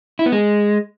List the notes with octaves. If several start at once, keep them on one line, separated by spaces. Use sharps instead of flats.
E4
B3
G#3